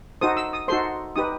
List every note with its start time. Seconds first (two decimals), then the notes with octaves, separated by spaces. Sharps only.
0.21 D#4 F#4 A4 C5 D#6
0.37 E6
0.53 D#6
0.68 D#4 F#4 A4 C5 C6
1.16 D#4 G4 B4 D#6